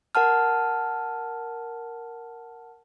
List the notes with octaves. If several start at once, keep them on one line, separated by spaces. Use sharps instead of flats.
A#4 F#5 A5 F6